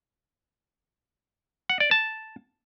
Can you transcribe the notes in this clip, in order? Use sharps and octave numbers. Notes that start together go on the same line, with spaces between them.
F#5
D5
A5